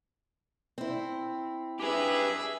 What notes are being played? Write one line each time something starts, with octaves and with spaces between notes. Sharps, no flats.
C4 E4
G4 G#4 B4 E5